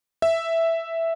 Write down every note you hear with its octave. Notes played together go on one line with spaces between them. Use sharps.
E5